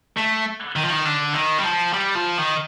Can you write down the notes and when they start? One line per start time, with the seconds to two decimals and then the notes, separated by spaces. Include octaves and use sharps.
0.17 A3
0.76 D#3
0.83 F3
0.90 D#3
1.05 D3
1.34 D#3
1.58 G3
1.64 F3
1.93 G3
2.15 F3
2.38 D#3